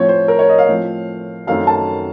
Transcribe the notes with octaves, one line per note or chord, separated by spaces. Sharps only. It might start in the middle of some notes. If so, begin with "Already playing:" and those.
Already playing: A2 F3 C4 C#5
C5
A#4
C#5
D#5
F5
A2 F3 C4
F#2 D#3 A3 C4 F5
A5